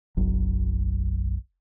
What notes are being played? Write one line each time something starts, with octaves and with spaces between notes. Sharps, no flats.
F#1 B1 F#3